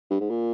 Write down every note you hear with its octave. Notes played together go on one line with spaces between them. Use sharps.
G2
G#2
A#2